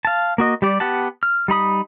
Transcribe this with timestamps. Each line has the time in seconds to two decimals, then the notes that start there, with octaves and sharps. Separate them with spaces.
0.05 F5 A5
0.38 A#3 F#4 D#5
0.62 G3 G4 D5
0.80 B3 G4 F#5 A5
1.23 F6
1.48 G3 D#4 B5 D#6